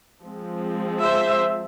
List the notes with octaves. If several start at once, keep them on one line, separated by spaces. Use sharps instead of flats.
F3 G#3 C4
C5 E5